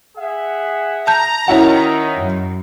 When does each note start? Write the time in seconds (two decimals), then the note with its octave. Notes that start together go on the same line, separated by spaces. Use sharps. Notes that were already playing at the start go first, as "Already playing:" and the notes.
0.17 G#4 E5 F#5
1.07 A5 A#5 G6
1.48 D#3 C#4 E4 F#4
2.16 F#2